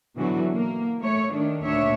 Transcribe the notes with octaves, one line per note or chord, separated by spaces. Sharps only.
B2 D3 E3 F#3 F#4
A#3
A3 C#5
D#3 A3 D4
D2 A#2 D4 C#5 E5